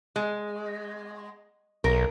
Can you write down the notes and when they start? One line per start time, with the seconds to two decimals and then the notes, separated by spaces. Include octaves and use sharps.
0.16 G#3
1.84 B1 A#4